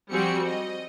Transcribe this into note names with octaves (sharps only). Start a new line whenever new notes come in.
F3 G3 C4 F#4 G#4 C#7
D#5